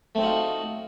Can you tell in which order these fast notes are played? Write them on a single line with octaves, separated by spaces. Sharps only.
A3 C4 D#4 F#4 F4